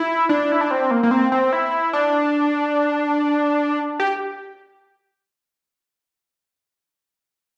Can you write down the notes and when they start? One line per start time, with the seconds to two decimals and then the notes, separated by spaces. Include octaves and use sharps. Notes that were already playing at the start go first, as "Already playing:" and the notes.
Already playing: E4
0.29 D4
0.52 E4
0.61 D4
0.71 C4
0.91 A#3
1.03 A#3
1.11 C4
1.32 C4
1.53 E4
1.93 D4
4.00 G4